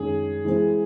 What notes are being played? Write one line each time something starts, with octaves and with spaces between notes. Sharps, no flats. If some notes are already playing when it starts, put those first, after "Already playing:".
Already playing: F#2 D#3 G#3 C#4 G#4
E3 G#3 C4